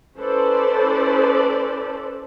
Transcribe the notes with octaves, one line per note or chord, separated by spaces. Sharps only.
C#4 E4 A4 B4 C5 D5